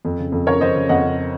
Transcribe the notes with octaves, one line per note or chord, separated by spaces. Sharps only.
F2
C#3
F2
C#3 A#4 C#5
F2 C5 D#5
C#3
F2 D#5 F#5
C#3